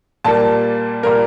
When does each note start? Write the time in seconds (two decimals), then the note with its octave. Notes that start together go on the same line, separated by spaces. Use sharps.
0.24 A#2 G3 A#3 A5
1.03 A#2 G3 A#3 A#4